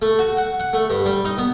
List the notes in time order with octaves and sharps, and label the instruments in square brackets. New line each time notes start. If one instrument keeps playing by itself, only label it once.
[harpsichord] A3
F#4
F#5
F#5
A3
G2
G3
D#4
B3